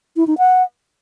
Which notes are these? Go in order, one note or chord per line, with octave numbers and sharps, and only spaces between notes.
E4
D#4
F#5